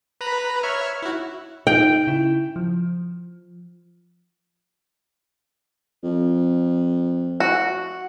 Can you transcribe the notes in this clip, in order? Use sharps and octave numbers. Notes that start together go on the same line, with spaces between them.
B4 A#5 B5
C#5 E5 F6
E4 F#4
D#4 F4 G5
C#3 E4
F3
F2
F#4